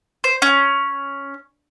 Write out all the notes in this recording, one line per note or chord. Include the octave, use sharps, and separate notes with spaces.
C5
C#4